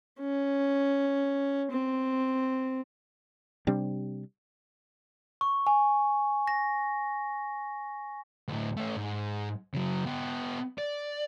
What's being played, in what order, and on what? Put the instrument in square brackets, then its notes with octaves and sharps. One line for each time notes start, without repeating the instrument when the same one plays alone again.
[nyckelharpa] C#4
C4
[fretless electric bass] C3 G3 C4 D4
[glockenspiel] C#6
G#5
A#6
[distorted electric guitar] D2 A2
A3 C#4
G#2
C#3 F#3
B3 G4
D5